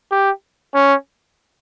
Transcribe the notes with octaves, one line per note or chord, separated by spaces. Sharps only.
G4
C#4